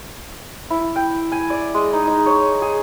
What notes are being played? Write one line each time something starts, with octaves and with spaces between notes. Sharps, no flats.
E4
G5
G#5
D5
G#3
D#4
D#4
C#5
G#4